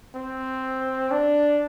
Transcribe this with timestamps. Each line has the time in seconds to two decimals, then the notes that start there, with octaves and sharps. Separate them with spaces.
0.15 C4
1.11 D4